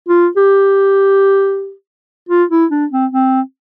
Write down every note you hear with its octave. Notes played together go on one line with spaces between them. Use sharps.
F4
G4
F4
E4
D4
C4
C4